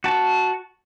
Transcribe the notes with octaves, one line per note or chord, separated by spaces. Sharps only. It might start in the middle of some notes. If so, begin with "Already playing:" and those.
F#4 A5